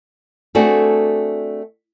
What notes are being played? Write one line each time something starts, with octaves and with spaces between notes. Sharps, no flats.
A3 C4 D4 F#4 G#4 A4